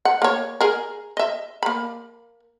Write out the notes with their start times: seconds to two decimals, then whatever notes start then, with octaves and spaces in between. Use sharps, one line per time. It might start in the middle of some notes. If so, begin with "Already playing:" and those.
0.05 F#5
0.22 A#3 C#5
0.61 G#4 A#4
1.17 D#5 E5
1.63 A#3 B5